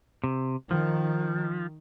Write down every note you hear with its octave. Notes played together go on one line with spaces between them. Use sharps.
C3
D#3 F3